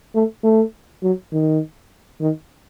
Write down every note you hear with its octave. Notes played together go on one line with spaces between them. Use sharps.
A3
A3
F#3
D#3
D#3